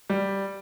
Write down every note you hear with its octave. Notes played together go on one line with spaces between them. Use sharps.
G3